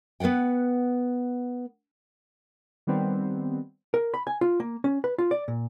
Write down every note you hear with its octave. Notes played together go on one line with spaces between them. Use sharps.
B3 B4 D5 F#5 G5
D#3 G3 B3 C4
A#4
B5
G#5
F4
A#3
C#4
B4
F4
D5
A#2